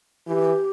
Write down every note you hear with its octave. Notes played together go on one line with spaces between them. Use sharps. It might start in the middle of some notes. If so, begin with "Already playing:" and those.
E3 G4